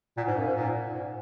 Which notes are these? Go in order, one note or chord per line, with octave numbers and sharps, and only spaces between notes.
A#2 F#5
G#2 G#5
F#2 F5
G#2 G#5
A#2
G#2